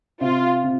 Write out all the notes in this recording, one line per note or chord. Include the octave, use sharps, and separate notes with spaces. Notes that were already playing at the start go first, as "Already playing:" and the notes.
C3 F4
C3